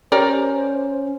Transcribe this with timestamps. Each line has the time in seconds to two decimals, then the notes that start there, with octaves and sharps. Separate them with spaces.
0.12 C#4 G4 A#4 C5 D5